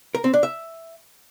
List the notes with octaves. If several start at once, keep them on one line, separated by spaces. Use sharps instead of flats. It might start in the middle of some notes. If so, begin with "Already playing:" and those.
A#4
C4
D4
E5